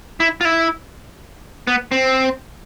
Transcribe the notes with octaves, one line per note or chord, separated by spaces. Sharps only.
E4
F4
E4
B3
C4